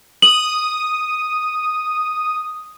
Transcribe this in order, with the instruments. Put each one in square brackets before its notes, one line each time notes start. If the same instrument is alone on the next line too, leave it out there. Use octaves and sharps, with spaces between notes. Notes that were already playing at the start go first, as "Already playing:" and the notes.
[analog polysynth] D#6 [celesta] F#7